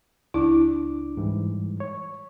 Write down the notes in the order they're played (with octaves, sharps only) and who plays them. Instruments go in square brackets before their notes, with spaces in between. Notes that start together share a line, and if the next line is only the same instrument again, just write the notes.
[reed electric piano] C#2 D4 D6 [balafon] E4
[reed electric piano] G#2 E3 G3
C#5